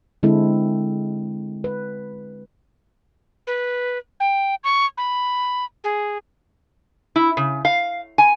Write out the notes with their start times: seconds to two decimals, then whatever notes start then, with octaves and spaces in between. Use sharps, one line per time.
0.23 D3 G#3 C4 E4 A4
1.64 B4
3.47 B4
4.20 G5
4.64 C#6
4.97 B5
5.84 G#4
7.16 E4
7.37 C#3
7.65 F5
8.18 G#5